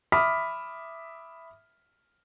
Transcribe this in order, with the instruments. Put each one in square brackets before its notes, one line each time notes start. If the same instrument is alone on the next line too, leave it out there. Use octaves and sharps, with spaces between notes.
[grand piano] E5 B5 D6 D#6 F6 B6